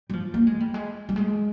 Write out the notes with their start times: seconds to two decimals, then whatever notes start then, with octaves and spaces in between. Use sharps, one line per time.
0.10 G3
0.13 F3
0.34 A#3
0.47 G#3
0.60 G3
0.74 G#3
1.09 G3
1.16 G#3